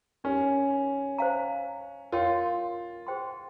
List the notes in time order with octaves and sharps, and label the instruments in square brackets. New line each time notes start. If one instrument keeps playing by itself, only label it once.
[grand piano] C#4 [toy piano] D#4 G4 A#4
[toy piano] C5 F5 A#5
[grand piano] F4 [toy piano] A#4 C#5 G5 C6
[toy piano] G#4 C5 G5 C6